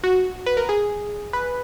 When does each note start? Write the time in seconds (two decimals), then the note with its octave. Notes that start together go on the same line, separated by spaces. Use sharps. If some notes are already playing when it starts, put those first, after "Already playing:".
0.04 F#4
0.46 B4
0.57 A#4
0.69 G#4
1.33 B4